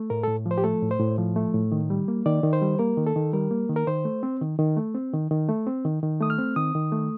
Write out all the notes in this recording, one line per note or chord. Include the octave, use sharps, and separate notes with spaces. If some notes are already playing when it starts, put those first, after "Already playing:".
Already playing: A3
A2 A#4
A2 A4
F3
C5
G4
A3 A4
A2
C5
A2
F3
A3
A2
D#3
G3
A#3
D#3 D5
D#3
C5
G3
A#3 A#4
D#3
A4
D#3
G3 A#4
A#3
D#3
A#4
D#3 C5
A3
C4
D#3
D#3
A3
C4
D#3
D#3
A3
C4
D#3
D#3
A3 D#6
F6
C4
D#3 D#6
D#3
A3